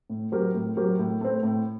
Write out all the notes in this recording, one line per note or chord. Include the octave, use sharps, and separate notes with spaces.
A2
F#3 C4 G4 A#4
A2
F#3 C4 G4 A#4
A2
A3 C4
A2